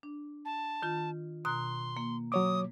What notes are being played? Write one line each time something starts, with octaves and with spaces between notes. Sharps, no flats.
D4
A5
D#3 F4
B2 A#5 C6 F#6
A#3
F#3 C#5 D6 D#6